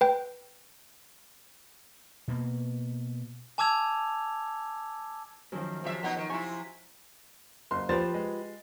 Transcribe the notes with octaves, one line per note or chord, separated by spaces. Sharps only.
B4 G5
B2 A#3
G#5 A5 D6 E6 G#6 F7
F#2 D#3 F3
C3 F3 E5
B2 B3 D#4
D#3 C#5
C3 E4 G#5 C6 C#6
F#1 C6
F3 F4 G4 B4 C5 A6
G#3